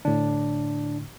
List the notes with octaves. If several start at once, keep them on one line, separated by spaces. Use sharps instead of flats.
A2 D3 D4